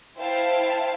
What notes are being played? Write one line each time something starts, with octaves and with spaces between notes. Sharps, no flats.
E4 C5 E5 F5 G5 A5